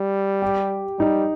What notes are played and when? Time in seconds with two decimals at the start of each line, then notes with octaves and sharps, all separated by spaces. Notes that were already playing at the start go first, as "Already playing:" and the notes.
Already playing: G3
0.42 G4
0.99 G3 D#4